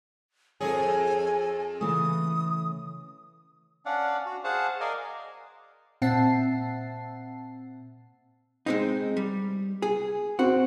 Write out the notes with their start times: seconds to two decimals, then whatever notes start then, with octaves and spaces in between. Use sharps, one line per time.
0.61 F2 G#4 A4 C#5 G#5
1.81 C#3 E3 A3 D#6
3.86 C#4 D4 D5 F5 F#5
4.25 F#4
4.44 G#4 C5 F5 F#5 A5
4.80 A#4 D5 D#5 F5 G#5
6.02 A#2 C4 E5 F#5 A5 C7
8.66 G#3 C4 D#4
9.17 G3
9.82 G#4
10.39 C4 F#4